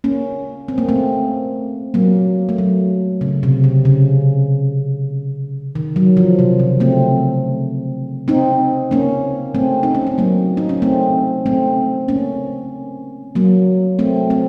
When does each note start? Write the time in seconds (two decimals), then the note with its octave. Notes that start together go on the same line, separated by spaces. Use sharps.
0.04 A#3 C#4
0.68 C4
0.78 A#3
0.89 A3 C4
1.94 F#3 A#3
2.49 A3
2.58 F#3
3.21 C#3
3.43 C3
3.64 C#3
3.85 C#3
5.75 D#3
5.96 F#3
6.17 F3
6.39 C3
6.59 C#3
6.80 A3 C4
8.28 C4 D#4
8.91 A#3 C#4
9.55 A3 C4
9.83 D#4
9.95 C#4
10.07 C4
10.18 F#3 A#3
10.57 D#4
10.69 C#4
10.82 A3 C4
11.46 A3 C4
12.08 A#3 C#4
13.35 F#3 A#3
13.99 A3 C4
14.30 A3 C4